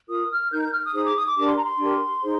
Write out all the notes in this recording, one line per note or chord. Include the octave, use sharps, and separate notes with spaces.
F4 A#4 D#6
F6
D#4 A#4 G6
G6
F6
D#6
D#4 G#4 C5 D#6
D6
D#6
D6
D4 G4 A#4 D6
C6
A#5
C6
D4 G4 A#4
D#4 G#4 C5